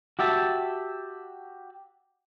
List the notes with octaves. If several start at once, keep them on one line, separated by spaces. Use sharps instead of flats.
F#4 G4 E5 A5